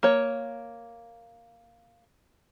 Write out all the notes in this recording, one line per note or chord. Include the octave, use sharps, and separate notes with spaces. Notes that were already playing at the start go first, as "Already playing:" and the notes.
A#3 C#5